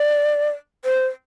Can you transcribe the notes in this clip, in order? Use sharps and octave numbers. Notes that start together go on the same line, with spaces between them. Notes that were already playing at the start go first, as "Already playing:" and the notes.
Already playing: D5
C5